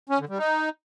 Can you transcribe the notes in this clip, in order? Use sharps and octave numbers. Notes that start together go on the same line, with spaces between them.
C#4
D3
G3
D#4